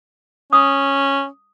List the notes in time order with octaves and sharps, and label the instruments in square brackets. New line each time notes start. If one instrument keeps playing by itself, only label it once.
[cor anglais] C#4 [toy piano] D#6